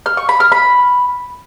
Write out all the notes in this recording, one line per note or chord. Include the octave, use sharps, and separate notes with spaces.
F6
C#6
B5
F6
B5